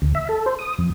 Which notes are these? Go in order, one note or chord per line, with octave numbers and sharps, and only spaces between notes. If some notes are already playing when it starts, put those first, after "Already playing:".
D2
E5
A4
C5
D#6
F2